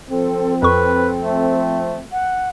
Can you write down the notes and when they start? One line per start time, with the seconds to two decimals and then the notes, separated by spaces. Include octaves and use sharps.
0.10 F3 C4 A4
0.62 F2 A4 B4 C#6
1.21 A3
2.11 F#5